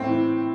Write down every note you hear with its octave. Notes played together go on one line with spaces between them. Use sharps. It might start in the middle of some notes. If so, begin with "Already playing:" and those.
Already playing: A2 C4
E3